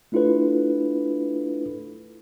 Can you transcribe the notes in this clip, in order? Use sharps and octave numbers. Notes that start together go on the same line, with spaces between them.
A3 D4 E4 F4 A4 B4